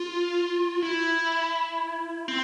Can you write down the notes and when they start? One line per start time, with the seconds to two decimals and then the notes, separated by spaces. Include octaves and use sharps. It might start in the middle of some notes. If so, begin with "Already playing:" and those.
Already playing: F4
0.82 E4
2.28 C4